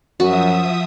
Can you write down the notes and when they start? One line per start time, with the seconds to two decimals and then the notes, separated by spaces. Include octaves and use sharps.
0.20 F#2 F3 F#4 E5 D#6